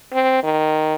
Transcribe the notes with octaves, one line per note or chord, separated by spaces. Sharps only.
C4
D#3